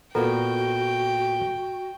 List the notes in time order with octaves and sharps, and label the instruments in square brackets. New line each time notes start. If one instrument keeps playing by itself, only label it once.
[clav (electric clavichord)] A#2 B3 A#4 [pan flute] F#4 [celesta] A4 [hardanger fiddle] G5